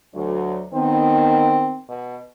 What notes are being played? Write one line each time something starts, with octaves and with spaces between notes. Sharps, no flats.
D2 F#3
D#3 B3 C4
B2